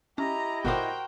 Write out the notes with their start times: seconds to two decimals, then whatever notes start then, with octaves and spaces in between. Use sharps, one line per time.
0.18 C#4 E4 G4 D#5 A#5
0.65 G1 A#2 F#4 A#4 C5 G5 D6